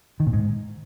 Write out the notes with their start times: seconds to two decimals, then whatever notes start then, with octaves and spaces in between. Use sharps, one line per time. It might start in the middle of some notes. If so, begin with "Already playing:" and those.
0.20 D#3
0.27 A#2
0.33 G#2